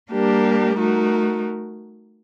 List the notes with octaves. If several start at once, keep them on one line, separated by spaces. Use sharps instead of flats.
G3 A#3 D4 G4 A#4
A3 D#4 F#4 A#4